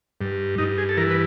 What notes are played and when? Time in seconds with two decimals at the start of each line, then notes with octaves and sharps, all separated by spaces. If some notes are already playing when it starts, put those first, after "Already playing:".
0.21 G2
0.58 G2 D#4
0.78 G#4
0.89 A4
0.97 E3 A#4
1.10 B4